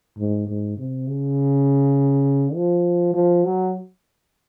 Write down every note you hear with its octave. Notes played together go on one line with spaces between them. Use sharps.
G#2
G#2
C3
C#3
F3
F3
F#3